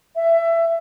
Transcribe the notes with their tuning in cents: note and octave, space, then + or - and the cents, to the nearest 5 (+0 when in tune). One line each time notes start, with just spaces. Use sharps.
E5 +20